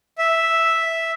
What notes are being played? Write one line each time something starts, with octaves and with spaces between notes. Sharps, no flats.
E5